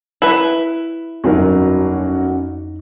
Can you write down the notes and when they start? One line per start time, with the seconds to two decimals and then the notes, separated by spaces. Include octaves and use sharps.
0.22 E4 B4
1.24 G1 F2 F#3 C#4 D#4 F#4 A#4